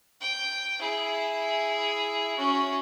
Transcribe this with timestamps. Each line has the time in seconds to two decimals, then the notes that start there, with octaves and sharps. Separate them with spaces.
0.21 G5
0.80 E4 G#4
2.38 C#4 F#4